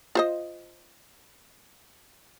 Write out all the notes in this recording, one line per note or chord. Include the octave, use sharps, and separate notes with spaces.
F4 C5 D#5